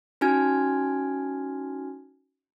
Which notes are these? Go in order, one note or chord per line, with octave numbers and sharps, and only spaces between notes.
C#4 D#4 F#4 G#5 F6 G#6